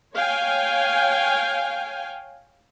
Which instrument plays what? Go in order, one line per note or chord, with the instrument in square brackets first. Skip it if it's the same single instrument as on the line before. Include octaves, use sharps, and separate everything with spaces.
[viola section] C#5 F5 G5 G#5